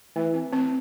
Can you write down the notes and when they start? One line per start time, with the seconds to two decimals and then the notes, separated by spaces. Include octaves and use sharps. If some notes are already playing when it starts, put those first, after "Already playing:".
0.16 E3 A3
0.34 C4
0.53 C4